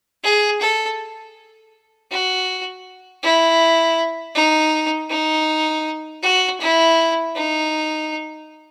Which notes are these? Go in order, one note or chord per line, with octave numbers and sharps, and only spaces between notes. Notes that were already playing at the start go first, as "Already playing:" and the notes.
G#4
A4
F#4
E4
D#4
D#4
F#4
E4
D#4